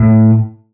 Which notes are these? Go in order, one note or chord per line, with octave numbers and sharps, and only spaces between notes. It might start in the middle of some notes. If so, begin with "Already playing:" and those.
Already playing: A2